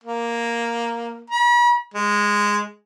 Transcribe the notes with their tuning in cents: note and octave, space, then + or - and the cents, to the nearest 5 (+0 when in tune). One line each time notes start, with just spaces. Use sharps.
A#3 +0
B5 -45
G#3 -10